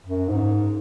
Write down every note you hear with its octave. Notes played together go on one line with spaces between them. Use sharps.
F#2
G#2